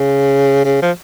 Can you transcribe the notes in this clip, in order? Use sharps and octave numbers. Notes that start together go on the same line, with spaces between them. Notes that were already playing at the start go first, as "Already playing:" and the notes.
Already playing: C#3
C#3
F3